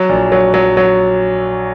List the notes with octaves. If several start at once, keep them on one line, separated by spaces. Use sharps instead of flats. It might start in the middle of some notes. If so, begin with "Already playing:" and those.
Already playing: F#3
A#1
F#3
F#3
F#3